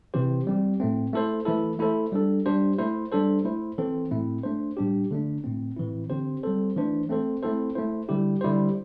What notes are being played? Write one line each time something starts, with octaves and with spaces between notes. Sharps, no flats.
C3 E3 C4 G4 C5
G3 C4 G4
A2 A3 C4
A3 E4 A4 C5
E3 A3 E4 A4
A3 E4 A4 C5
G3 D4 A4
G3 D4 G4 C5
A3 E4 C5
G3 D4 A4 C5
A3 E4 C5
E3 C4 A4 C5
A2 A3 C4 E4
A3 D4 C5
A2 G3 D4 G4
D3 A3 D4
A2 A3 C4
A2 E3 C4 E4
D3 C4 G4 C5
G3 C4 A4 C5
E3 A3 D4 C5
A3 C4 A4 C5
A3 C4 E4 A4 C5
A3 E4 C5
D3 G3 E4 G4
D3 G3 E4 G4 C5